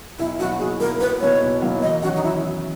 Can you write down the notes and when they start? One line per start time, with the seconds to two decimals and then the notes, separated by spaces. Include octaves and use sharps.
0.19 B1 E4
0.39 B2 F#3 A#3 E4 F#4
0.59 B1 G#4
0.80 B2 F#3 A#3 E4 A#4
1.00 B1 B4
1.21 B2 F#3 A#3 E4 C#5
1.42 B1
1.62 B2 F#3 A#3 E4
1.82 E2 D#5
2.02 D#3 F#3 C#4 F#4
2.16 D#4
2.24 E4